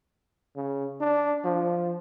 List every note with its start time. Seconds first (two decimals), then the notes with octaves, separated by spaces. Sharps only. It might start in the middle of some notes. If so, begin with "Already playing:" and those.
0.56 C#3
1.00 D4
1.45 F3